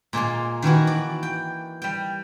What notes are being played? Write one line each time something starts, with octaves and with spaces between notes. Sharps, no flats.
A#2 G#3 A#3 C6
D#3 E3 E4 F#4
D5
G5
G3 G5